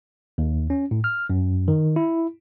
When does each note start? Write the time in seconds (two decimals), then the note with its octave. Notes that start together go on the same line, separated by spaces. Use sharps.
0.38 D#2
0.70 C#4
0.91 A2
1.04 F6
1.30 F#2
1.68 D#3
1.96 E4